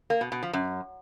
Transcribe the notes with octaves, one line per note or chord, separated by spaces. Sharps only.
A#3
B2
B2
F3
F#2